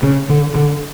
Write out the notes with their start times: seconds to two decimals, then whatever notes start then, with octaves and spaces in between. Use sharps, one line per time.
0.03 C#3
0.30 D3
0.55 D3